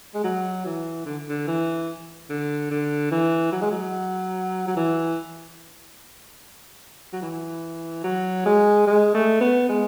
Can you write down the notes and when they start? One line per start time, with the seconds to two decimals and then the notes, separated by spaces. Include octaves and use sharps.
0.14 G#3
0.24 F#3
0.65 E3
1.05 D3
1.28 D3
1.47 E3
2.30 D3
2.71 D3
3.11 E3
3.52 F#3
3.62 G#3
3.71 F#3
4.67 F#3
4.76 E3
7.13 F#3
7.22 E3
8.04 F#3
8.46 G#3
8.87 G#3
9.14 A3
9.41 B3
9.69 G#3